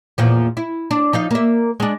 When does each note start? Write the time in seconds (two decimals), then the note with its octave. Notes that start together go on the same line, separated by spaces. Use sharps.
0.18 E2 A#2 F3
0.57 E4
0.91 D4
1.13 F3 D#4 F5
1.31 A#3 E5
1.80 G#3 D4